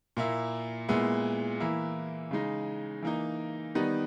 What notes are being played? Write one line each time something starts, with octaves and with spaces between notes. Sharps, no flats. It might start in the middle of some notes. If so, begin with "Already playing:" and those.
A#2 A#3 E4
A#2 G#3 B3 E4
E3 A#3 E4
C#3 G#3 D#4
E3 A#3 D#4
D#3 G3 B3 D#4